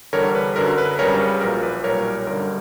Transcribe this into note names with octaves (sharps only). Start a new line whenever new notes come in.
E2 D3 G3 A#4 C#5
B4
F#2 D3 F#3 A#4
B4
C#2 C#3 G3 A#4 C#5
B4
A#1 A#2 F#3 A#4
B4
B1 A#2 G3 A#4 C#5
G1 F#2 D3 G3 A#4